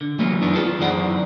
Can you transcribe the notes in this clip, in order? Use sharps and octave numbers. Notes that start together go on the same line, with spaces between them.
D3
E3 F#3 G3 A3 A#3 C#4
F#2 D#3 E3 B3 D4
F4 G#4 A4
F#2 D#3 E3 C4 D5 F#5